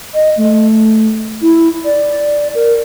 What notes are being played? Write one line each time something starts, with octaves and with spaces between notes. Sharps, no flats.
D#5
A3
E4
D5
A#4